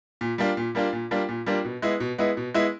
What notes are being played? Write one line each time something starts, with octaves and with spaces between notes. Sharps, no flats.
A#2
G3 A#3 D4 F4
A#2
G3 A#3 D4 F4
A#2
G3 A#3 D4 F4
A#2
G3 A#3 D4 F4
B2
G#3 B3 E4
B2
G#3 B3 E4
B2
G#3 B3 E4